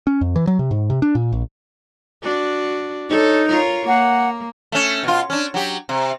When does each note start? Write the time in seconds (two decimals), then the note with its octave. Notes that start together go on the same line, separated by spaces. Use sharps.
0.07 C#4
0.21 F2
0.36 E3
0.47 F#3
0.59 C3
0.71 G#2
0.90 C3
1.02 D4
1.15 A#2
1.32 A#1
2.23 D4 F#4
3.09 D#4 A4 C#5
3.48 F4 A#4 C#5
3.87 A#3 F#5
4.72 A3 C#4
5.03 B2 F4
5.30 C#4 D4
5.54 F#3 G4
5.89 C3